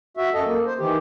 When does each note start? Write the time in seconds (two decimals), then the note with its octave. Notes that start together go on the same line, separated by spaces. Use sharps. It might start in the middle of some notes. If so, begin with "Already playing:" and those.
0.17 F#4 E5
0.34 F#2 A4 D#5
0.46 A#3
0.66 C5
0.79 D#3 E3 G4